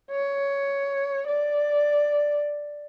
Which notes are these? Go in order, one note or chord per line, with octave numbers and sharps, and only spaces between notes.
C#5
D5